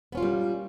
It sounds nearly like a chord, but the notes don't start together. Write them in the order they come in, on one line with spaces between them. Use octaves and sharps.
B3 C#4 F4 A#3 G3